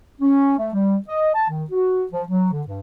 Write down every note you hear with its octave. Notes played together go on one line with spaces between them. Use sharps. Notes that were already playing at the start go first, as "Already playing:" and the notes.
C#4
A3
G3
D#5
A5
D#3
F#4
F3
F#3
D3
G2